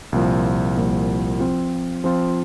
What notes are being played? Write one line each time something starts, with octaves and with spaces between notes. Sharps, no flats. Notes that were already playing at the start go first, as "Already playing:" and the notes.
C2 A#2 F3
C2 A#2 F3
F3 C4 F4
F3 C4 F4